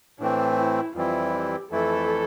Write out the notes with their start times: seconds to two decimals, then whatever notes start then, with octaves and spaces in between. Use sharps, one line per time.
0.19 A2 E3 A3 C4 D4
0.58 E4
0.95 F2 E3 G3 C4 E4 F4
1.34 G4
1.71 F2 E3 A3 E4 A4